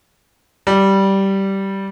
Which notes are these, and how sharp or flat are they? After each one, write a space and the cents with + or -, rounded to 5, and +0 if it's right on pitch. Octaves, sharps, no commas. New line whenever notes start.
G3 -10